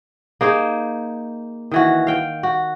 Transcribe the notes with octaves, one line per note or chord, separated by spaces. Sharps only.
A#3 D#4 G#4 C5
D#3 E3 F#4
F5 G5
F#4